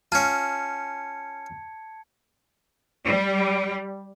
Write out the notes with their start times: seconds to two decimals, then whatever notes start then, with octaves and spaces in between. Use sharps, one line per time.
0.12 C#4 F4 A5 G#6 C#7
3.05 G3